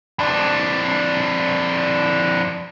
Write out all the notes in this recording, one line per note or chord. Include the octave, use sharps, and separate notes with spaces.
F2 D4